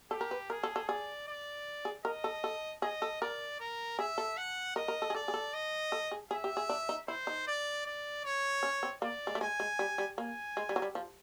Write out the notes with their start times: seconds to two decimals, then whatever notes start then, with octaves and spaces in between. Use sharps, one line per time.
0.11 G4 A4
0.21 A#4
0.31 B4
0.50 G#4 A#4
0.63 A4
0.76 A4
0.89 G#4 D5
1.27 D5
1.85 G#4
2.05 A#4 D#5
2.24 A4
2.44 A4
2.82 G#4 D#5
3.02 A4
3.21 A#4 D5
3.60 A#4
3.99 G#4 E5
4.18 A4
4.37 F#5
4.76 A#4 D#5
4.88 A#4
5.02 A4
5.10 G#4
5.15 A4 D5
5.28 G#4
5.34 A4
5.54 D#5
5.92 A4
6.11 G#4
6.31 G#4 E5
6.44 G4
6.57 G#4
6.69 D4
6.89 D#4
7.08 E4 C5
7.27 D#4
7.47 D5
7.86 D5
8.24 C#5
8.63 C#4
8.83 C4
9.02 A#3 D5
9.27 G#3
9.35 A3
9.40 G#3 G#5
9.60 G#3
9.79 G3
9.98 G3
10.18 A#3 G#5
10.57 G#3
10.69 G3
10.76 F#3
10.82 G3
10.95 F3